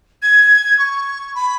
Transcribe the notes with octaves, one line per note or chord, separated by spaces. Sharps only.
G#6
C#6
B5